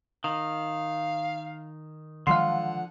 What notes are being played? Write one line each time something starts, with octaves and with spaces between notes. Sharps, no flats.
D#3 F5
D3 D#3 F3 F#3 G#3 F5 F#5 C6